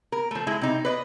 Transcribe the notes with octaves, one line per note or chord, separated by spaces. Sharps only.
A#4
F3 A3
G#3 E4
C3 D#4
B4 D5 D#5